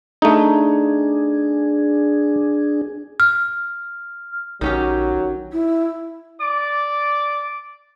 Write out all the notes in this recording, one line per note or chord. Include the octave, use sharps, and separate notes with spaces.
A3 D4 D#4 G#4
F6
A#1 D#3 F#3 C#4 G4
E4
D5 D6